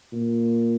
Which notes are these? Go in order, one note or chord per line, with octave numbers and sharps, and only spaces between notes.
A#2